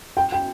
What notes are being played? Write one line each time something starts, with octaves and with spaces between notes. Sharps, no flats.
G5
G5